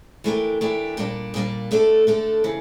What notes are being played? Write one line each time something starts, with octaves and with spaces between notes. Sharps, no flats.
E3 A3 D4 G4 A#4
E3 A3 D4 G4 A#4
A#2 G3 A#3 D4
A#2 G3 A#3 D4
D3 A3 D4 A4
D3 A3 D4 A4
C#3 E3